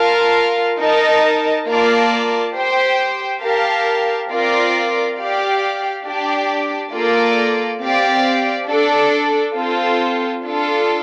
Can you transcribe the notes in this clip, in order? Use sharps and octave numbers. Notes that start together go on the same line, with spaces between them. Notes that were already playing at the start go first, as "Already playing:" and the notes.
Already playing: F4 A#4 F5 A5
D#4 A#4 D#5 A5
A#3 F4 A#4 D5 A5
G4 C5 G5
G4 A#4 F5 A5
C4 F4 A#4 D5
G4 D5 F5
D4 G4 D5
A#3 F4 A4 D5
C4 G4 D5 F5
D4 A4 D5
C4 F4 A4 C5
D4 F4 A4